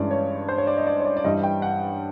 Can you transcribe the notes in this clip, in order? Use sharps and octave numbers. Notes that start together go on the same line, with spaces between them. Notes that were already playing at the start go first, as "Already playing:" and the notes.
Already playing: G2 E3 G#3 C#4 D5
C#5
C5
C#5
D5
D#5
D5
C#5
D5
D5
G2 E3 G3 D#5
G5
F#5